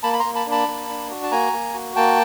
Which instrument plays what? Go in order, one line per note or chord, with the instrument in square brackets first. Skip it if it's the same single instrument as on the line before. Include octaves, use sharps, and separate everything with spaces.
[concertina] A#3 A5 B5
B5
A#5 C6
A#3
A5 B5
D4
A5 B5
A#3
D4
F#4
A5
A#3 G#5 A#5
A#3
F#4
A#3 G5 A5